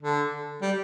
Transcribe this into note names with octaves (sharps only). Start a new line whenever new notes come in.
D3
G3